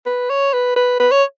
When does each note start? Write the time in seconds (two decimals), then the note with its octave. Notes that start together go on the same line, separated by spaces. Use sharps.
0.06 B4
0.30 C#5
0.53 B4
0.76 B4
1.00 B4
1.12 C#5